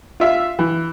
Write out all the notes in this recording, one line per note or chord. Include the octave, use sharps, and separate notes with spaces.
F4 E5 F5
E3